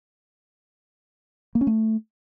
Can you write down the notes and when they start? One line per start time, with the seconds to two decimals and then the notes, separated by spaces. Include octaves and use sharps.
1.55 A#3
1.61 C#4
1.67 A3